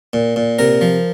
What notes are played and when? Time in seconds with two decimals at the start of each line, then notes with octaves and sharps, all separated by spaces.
0.13 A#2
0.36 A#2
0.59 C3 A#4
0.81 F3